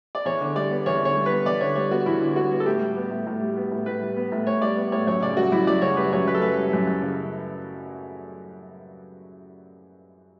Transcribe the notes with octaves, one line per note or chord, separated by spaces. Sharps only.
D5
E2 C#5
D3
G3 D5
B3
E2 C#5
D3 C#5
G3
B3 B4
E2 D5
D3 C#5
G3 C#5
B3 F#4
E2 E4
D3
G3 F#4
B3
A4
A2 G4
G3
B3
A2
A2
G3
B3
A2
A2 B4
G3
B3
A2
A2 C#5
G3 D5
B3
A2 C#5
F#2 C#5
C#3 D5
G3 F#4
F#2 E4
F#2 D5
C#3 C#5
G3 B4
F#2 C#5
F#2 B4
A4
C#3 B4
G3
F#2
F#2
C#3